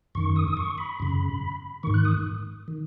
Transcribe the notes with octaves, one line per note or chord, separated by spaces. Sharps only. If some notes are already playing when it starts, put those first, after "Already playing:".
F#2 D#3 C#6
D#6
D#6
C#6
B5
F#2 C#3
G#2 D#3 C#6
F#6
D#6
D#3